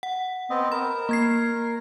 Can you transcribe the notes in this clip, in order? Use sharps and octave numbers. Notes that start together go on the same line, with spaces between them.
F#5
B3 C4 D#5
A#4 B5
A#3 G#6 C7